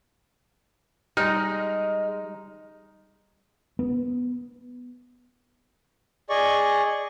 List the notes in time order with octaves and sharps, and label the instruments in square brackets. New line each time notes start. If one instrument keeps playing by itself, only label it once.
[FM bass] G3 [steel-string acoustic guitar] G#3 [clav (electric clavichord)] D#4 [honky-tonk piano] F6 A#6
[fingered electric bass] B3
[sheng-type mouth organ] G#4 D5 D#5 C#6